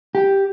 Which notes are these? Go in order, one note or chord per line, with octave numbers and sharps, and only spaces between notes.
G4